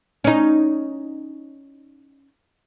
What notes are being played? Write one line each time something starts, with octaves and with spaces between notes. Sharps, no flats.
C#4 D#4